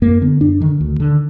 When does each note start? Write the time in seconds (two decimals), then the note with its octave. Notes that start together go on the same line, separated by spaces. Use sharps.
0.02 F#2 A#3
0.21 D3 B3
0.41 F#2 D4
0.60 D3 D#3
0.81 D2
1.00 D3